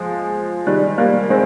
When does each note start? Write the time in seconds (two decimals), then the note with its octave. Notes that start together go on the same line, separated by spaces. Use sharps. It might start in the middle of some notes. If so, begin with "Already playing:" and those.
Already playing: F3 G#3
0.67 D#3 G3
0.98 G3 A#3
1.30 G#3 C4